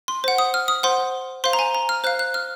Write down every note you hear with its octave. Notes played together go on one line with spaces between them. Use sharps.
C6
C5 F#5
D#6
F6
D#6
C5 F#5 C6
C5 F5 C6
A#5
G#5
A#5
F6
C5 F5 F#6
F#6
F6